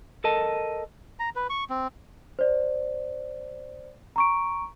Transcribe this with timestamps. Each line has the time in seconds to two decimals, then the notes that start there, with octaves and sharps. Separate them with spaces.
0.24 A4 A#4 D#5 A5
1.19 A#5
1.36 B4
1.50 C#6
1.70 C4
2.39 C5 D5
4.16 A#5 C#6 D7